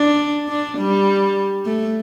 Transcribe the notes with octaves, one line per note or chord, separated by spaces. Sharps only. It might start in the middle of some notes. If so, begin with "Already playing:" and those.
Already playing: D4
D4
G3
A3